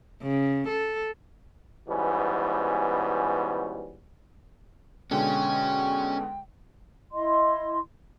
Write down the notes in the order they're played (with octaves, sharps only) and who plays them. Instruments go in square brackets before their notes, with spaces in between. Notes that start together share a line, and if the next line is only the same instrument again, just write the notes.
[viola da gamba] C#3
A4
[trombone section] G#2 B2 E3 G3 B3 C#4
[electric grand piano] B2 D3 G#3 [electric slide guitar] C#4 [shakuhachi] G5
[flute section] E4 D#5 C6